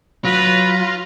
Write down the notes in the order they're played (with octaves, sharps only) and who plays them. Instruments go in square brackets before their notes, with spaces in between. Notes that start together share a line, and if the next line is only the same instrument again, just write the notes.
[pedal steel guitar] F#3 [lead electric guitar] F4 [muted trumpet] B4 [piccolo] A#6